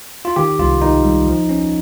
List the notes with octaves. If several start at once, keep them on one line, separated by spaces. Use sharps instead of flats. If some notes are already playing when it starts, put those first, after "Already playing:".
F4
D#3 G4
C2 F4
D#3 D#4
G3
F3
C#4